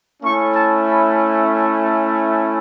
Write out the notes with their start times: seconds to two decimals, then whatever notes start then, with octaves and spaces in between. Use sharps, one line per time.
0.21 A3 C#4 E4 C#6
0.53 A5
0.85 B5